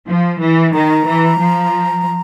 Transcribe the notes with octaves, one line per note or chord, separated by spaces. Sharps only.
F3
E3
D#3 A#5
E3
F3